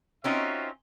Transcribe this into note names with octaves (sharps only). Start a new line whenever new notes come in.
C4 C#4 D#4 F4 F#4 E5